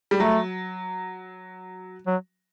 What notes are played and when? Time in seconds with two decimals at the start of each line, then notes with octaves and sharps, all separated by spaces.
0.11 G3
0.20 F#3 A3
2.07 F#3